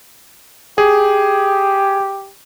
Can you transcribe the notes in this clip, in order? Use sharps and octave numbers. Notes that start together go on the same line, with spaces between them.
G4 G#4